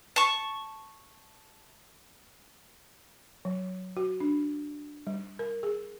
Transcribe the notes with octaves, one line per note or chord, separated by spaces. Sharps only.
A5 C#6
F#3
F#4
D4
G3
A#4
G#4